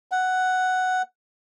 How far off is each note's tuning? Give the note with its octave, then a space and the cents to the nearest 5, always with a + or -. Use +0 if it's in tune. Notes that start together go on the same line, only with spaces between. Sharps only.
F#5 +5